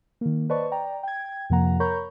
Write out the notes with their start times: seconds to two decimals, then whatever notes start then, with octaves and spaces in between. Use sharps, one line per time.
0.21 D#3 A#3
0.50 B4 C5 D5 D#5 A5 C#6
0.71 D5 G5 A#5
1.03 G5 G#6
1.50 F2 C3 F3 A#3 F#5 A#5
1.80 A#4 C#5 A#5 B5 C#6 G6